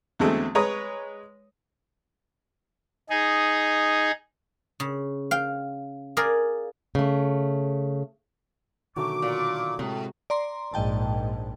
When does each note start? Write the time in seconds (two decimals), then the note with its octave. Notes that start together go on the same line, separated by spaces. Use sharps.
0.19 E2 D3 F#3 G#3 A3 C4
0.55 G#3 B4 C#5 A#5 D#6
3.10 D#4 G#4
4.80 C#3
5.31 F5 G5
6.17 G#4 A#4 D5 F5
6.95 C#3 A3
8.96 B2 D3 D#3 F#3 A3 G#5 D6
9.22 A#2
9.79 A2 C3 G#3
10.30 D5 A#5 C6
10.74 A#1 G#2 D#5 G5 A5